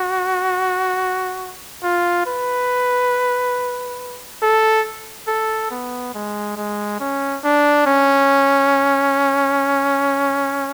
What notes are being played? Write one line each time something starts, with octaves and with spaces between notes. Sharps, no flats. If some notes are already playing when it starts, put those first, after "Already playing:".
Already playing: F#4
F4
B4
A4
A4
B3
G#3
G#3
C#4
D4
C#4